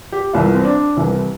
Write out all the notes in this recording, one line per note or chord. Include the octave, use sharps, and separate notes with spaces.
G4
C2 C3 E3 F4
C4
D4
C2 C3 E3